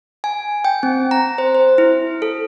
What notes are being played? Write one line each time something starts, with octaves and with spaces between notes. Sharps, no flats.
G#5
G5
C4
A#5
C5
C5
E4
A4